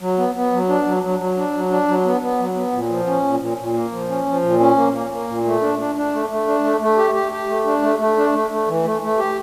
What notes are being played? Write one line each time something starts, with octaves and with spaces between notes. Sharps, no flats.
F#3
B3
B3
F#3
D4
F#3
F#3
F#3
D4
F#3
D4
F#3
B3
B3
F#3
B3
A#2
F3
C#4
A#2
A#2
A#2
A#3
F3
C#4
F3
A#2
C#4
A#3
A#3
A#3
A#2
A3
D4
D4
D4
A3
A3
D4
A3
A3
G4
G4
G4
A3
D4
A3
A3
D4
A3
A3
E3
A3
A3
G4